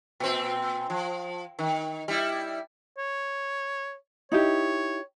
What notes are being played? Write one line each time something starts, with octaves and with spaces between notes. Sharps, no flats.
A#2 C4
F3
D#3
G3 E4
C#5
D#4 E4 G4 C#5